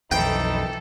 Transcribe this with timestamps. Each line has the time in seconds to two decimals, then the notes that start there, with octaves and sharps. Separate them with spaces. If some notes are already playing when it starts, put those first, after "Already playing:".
0.11 B1 F2 E3 D#4 A4 G5